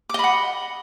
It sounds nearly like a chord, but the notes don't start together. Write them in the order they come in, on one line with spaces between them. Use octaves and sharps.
D6 D#5 B5 F#5